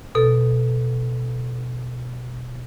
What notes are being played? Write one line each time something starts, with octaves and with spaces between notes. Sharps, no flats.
B2 A4